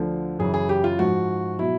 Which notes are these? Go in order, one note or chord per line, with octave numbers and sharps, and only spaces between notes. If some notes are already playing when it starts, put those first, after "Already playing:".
Already playing: D2 D3 F3
F#2 C#3 E3 G#4
G#4
G4
F4
G#2 F3 F#4
B2 F#3 E4